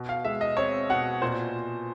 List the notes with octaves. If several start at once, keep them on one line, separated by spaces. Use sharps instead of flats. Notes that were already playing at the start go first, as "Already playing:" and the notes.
Already playing: B2
F5
G#3 E5
D#5
C4 C#5
B2 F#5
A#2 C5